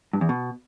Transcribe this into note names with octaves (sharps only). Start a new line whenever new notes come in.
G2
E2
B2